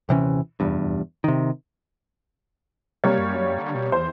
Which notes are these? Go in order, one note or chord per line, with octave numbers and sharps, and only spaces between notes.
D#1 C3 E3 C#4
F1 E2 G2
C3 D#3
C3 G3 A#3 C#5
F#2
D3
B2
E2 C5